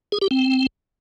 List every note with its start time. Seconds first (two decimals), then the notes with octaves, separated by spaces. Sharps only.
0.12 G#4
0.22 G4
0.31 C4